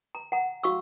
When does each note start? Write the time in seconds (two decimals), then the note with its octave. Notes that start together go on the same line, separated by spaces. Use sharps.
0.15 A#5
0.32 F#5 A#5
0.63 F#4 F5 C#6 E6